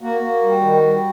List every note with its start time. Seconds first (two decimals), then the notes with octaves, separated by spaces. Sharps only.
0.02 A#3 F#4
0.21 A#3
0.42 G3
0.62 D#3
0.82 G3